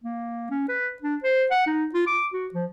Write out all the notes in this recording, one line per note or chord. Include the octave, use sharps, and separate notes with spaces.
A#3
C#4
B4
D4
C5
F#5
D#4
F4
D6
F#4
F3